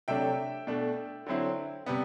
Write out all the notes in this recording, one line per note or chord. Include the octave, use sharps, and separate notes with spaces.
C3 F#3 A3 D4 E5 G5
B2 A3 D4
D3 F#3 C4 E4
C3 G3 B3